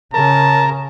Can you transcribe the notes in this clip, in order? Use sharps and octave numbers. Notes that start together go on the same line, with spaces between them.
C#3 A#4 A5